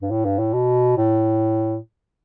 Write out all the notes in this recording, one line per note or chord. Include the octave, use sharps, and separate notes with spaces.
G2
A2
G2
A2
B2
A2